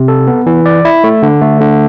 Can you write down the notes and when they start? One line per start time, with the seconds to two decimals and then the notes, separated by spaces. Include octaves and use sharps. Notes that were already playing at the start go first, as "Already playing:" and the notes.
Already playing: C3
0.08 A4
0.27 B3
0.46 E3
0.66 D5
0.85 E4
1.04 A3
1.23 D3
1.41 A3
1.61 D3